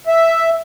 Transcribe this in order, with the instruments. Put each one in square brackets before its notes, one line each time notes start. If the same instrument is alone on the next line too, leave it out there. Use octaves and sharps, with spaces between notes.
[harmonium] E5